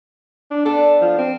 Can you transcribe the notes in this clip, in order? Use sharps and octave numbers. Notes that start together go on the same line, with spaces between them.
D4
B3 D4 A4
F3
C4